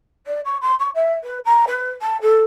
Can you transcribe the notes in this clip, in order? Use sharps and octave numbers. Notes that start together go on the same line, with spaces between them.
D5
C#6
C6
C#6
E5
B4
A#5
B4
A5
A4